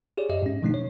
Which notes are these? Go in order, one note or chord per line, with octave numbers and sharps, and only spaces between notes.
G4 G#4 C#5 D5
F#2 G4 D#5 E5
G#2 C#4
B2 D#3 F3 A3 D4 D#4
C#5